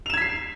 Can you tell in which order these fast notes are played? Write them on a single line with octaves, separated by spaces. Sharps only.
F7 E7 G#6 B6 C7